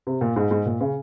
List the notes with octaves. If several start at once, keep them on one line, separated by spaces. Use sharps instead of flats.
C3
A#2
G#2
G#2
A#2
C#3